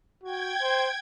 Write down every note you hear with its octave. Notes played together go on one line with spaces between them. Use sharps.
F#4 G5 G#6
C5